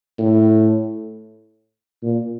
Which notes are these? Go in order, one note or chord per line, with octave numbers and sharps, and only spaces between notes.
A2
A#2